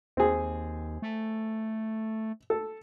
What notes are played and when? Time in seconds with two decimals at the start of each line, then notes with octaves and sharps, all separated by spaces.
0.17 D#2 C4 G#4
1.02 A3
2.50 A4